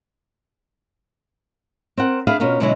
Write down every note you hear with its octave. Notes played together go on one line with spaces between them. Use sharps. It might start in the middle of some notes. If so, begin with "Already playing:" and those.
C4 A#4 F#5
D4 G#4 B4 E5 F5
B2 C#4 F4 A#4
B2 D3 F#3 G#3 C#4 E4